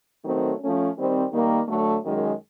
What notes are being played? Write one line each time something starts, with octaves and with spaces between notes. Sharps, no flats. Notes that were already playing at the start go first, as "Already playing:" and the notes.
D#3 F#3 A3 C4
F3 A3 C#4
D#3 G3 C4
D#3 G3 A#3
D3 F#3 A3
F#2 D#3 G#3